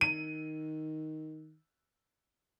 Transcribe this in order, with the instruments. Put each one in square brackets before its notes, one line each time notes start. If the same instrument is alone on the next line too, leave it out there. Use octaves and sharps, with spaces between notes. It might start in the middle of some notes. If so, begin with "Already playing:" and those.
[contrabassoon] D#3 [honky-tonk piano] D#7